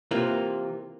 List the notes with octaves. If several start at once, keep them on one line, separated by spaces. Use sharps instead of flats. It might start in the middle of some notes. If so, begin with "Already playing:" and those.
C3 E3 A#3 F4